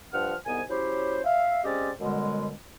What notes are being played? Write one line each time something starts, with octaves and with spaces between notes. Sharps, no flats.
G2 F3 F#5 F6
C2 G#2 B3 G#5
F#3 C#4 E4 G4 C5
E5 F5
G#3 C4 C#4 G4 D5 D#5
F#2 B2 D3 G3 G#3